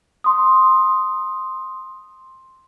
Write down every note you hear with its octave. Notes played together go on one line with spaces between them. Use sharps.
C6 D#6